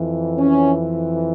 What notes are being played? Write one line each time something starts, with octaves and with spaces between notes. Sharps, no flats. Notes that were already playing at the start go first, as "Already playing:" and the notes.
Already playing: F2 E3
C#4